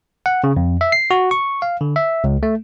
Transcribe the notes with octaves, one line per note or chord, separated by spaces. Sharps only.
F#5
C#3
F2
E5
C7
F#4
C#6
F5
D3
E5
C#2
A3